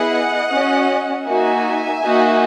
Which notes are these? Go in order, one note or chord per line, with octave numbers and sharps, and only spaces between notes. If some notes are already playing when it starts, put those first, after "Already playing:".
Already playing: B3 E4 G#4 D#5 F#5
C#4 F#4
A#3 D#4 F#4 E5 G#5
A#3 D#4 F#4